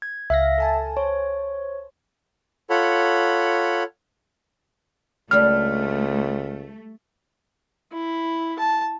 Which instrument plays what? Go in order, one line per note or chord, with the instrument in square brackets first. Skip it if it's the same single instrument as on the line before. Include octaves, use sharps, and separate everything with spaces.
[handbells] G#6
[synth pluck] C#2 F5 A#6 [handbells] E5
[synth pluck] A4 G#5 A5
[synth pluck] C5 [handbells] C#5
[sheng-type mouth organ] F4 A4 C#5 F#5 B5
[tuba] C#2 [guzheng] G3 D4 B5 [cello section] A3 [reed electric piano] F6
[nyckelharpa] E4
A5